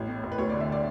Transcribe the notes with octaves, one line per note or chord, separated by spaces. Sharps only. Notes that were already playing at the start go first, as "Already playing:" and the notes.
Already playing: A1 E4
A2
A1
B4
D2 C#5
D5
D3
E5
D5